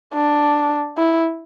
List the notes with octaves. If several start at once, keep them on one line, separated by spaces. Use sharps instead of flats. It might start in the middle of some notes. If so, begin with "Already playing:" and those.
D4
E4